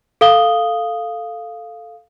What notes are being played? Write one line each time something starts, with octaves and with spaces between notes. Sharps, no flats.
A4 F5 D#6 G7